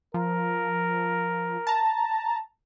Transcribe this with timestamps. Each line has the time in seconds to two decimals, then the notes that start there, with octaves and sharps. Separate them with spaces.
0.14 F3 A#4
1.67 A5 A#5